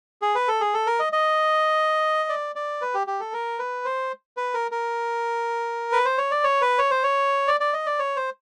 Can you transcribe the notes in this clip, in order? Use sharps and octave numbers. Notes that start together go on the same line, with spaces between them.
G#4
B4
A4
G#4
A4
A#4
D#5
D#5
D5
D5
B4
G4
G4
A4
A#4
B4
C5
B4
A#4
A#4
B4
C5
C#5
D5
C#5
B4
C#5
C5
C#5
D5
D5
D#5
D5
C#5
C5